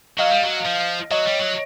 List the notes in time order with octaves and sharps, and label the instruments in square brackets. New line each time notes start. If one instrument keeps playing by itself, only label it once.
[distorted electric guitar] F#3 [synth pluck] D#5 F5
[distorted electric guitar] G3
F#3
F3
[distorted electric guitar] F#3 [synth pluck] C#5 D#5
[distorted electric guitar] G3
F#3